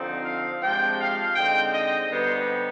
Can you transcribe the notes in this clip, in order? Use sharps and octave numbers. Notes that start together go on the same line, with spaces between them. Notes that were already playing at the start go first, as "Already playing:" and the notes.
Already playing: D3 F3 C4 D#4
F5
C3 F3 G#3 D4 G5
F5
D3 G#3 C4 D#4 G5
D#5
D3 G3 B3 D#4 C5